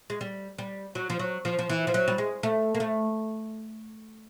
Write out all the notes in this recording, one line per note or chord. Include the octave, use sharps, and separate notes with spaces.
G#3
G3
G3
F#3
F3
F#3
F3
F3
E3
F3
F#3
G3
G#3
A3
A#3
A3